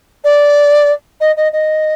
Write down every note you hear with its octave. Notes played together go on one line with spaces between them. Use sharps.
D5
D#5
D#5
D#5